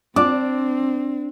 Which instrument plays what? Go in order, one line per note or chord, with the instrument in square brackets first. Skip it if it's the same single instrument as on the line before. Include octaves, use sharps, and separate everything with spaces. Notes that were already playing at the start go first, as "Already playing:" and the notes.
[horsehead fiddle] C4 [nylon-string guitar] D4 [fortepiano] D6